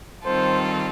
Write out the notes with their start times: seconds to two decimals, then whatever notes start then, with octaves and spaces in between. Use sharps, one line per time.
0.25 D#3 G3 C4 F4 A4 C5